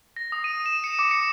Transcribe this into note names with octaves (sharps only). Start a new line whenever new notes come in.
A#6
D#6
D#7
E7
C#7
D6
C#7